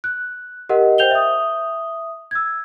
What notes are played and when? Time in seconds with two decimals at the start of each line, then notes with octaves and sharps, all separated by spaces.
0.04 F#6
0.69 G4 A#4 D#5 F#5
0.98 C5 G5 G6 F7 G7
1.11 E5 D#6
2.31 E6 G#6